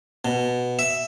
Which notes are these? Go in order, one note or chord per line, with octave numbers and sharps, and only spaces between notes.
B2
E5